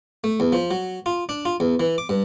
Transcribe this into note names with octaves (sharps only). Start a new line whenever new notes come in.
A3
E2
F3
F#3
F4
D4
F4
E2
E3
D6
G2